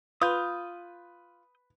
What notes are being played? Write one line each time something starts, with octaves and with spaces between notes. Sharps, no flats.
F4 B4 D#6 G6